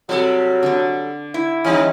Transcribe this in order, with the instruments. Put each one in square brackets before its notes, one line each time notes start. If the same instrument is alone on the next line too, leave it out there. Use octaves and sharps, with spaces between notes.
[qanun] C3 [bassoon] F#3 [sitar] G3 A4
[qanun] D3 D4
[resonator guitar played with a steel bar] E4
[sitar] D#3 G3 D#4 [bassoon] C#4 [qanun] D#5 F#5